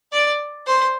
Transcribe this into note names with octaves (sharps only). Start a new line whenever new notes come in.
D5
C5